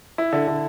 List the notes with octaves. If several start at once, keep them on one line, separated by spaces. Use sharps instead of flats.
E4
D3
D3